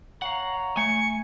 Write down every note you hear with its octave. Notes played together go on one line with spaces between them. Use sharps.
C#5 F5 F#5 A#5
A3 G#5 C#7